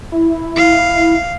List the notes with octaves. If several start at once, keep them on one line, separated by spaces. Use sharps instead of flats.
E4
F5